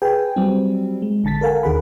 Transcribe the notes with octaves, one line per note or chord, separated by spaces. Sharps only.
G#4 B4 G5 G#5
F#3 G3 C4
G#3
A1 D3 A5 A6 B6
A4 A#4 F5 F#5 G#5
D#2 D#3 G#4 A#4 F#5 B5